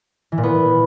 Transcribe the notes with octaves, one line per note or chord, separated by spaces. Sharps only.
E3
A#2
B3